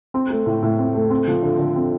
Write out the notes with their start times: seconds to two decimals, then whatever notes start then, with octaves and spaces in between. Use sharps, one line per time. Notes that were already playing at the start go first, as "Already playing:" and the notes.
0.14 C4
0.30 A3
0.46 A2
0.63 A2
0.79 C4
0.94 A3
1.10 C4
1.28 F3
1.42 D3
1.59 D3
1.76 C4